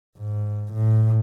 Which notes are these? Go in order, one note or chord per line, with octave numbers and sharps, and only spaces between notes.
G#2
A2